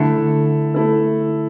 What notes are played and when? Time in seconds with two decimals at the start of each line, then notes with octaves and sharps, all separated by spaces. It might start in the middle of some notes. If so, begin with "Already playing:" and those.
Already playing: D3 A3 E4 A4
0.74 A3 E4 A4